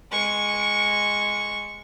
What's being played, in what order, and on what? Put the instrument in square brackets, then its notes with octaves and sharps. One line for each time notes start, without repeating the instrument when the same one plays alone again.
[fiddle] G#3 C#6